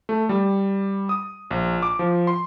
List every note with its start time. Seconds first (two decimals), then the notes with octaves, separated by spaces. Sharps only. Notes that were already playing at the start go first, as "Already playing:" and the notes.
0.09 A3
0.29 G3
1.09 D#6
1.51 A#1
1.83 D6
1.99 F3
2.27 C6